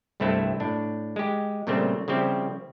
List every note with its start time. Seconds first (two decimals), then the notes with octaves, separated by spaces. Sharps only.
0.20 C2 G2 A3 C4 E4 A4
0.60 A2 D4
1.16 G#3 G4
1.67 A#2 C#3 G3 A3 C4 G4
2.08 C#3 F3 G3 C4 E4 G4